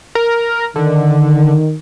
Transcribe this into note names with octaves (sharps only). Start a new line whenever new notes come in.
A#4
D3 D#3